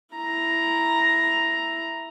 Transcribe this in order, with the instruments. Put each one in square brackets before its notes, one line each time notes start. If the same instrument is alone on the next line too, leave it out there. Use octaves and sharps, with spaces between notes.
[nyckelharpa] E4 A#5